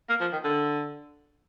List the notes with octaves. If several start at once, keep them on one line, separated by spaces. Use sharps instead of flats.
A#3
F3
D#3
D3